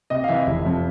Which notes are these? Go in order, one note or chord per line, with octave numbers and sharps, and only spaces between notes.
C3 D#5
F5
E3 E5
F1
F2